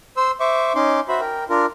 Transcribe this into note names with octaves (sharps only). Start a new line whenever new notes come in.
C5 C6 E6
C5 E5 C#6 D6
C#4 D#4 C6 D6
F#4 C5 E5 B5
A#4 G5
D4 F4 A#4